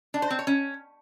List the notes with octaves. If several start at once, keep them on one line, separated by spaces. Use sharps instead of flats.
D4
C5
C4
C#5
C#4